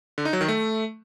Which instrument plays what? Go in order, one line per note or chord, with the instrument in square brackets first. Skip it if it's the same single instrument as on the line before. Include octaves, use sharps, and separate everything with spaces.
[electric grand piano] D3
D#4
F#3
D#3
A3